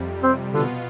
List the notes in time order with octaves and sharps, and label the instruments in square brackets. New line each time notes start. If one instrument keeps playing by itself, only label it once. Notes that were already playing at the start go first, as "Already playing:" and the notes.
Already playing: [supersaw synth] F2 C3 G3
[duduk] C4
[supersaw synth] B2 B3 F4 [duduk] D3